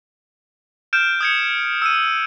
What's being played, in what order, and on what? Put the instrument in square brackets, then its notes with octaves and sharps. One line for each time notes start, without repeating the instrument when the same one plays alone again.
[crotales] F6 G6 D7 E7
D#6 G#6 C#7
E6 D#7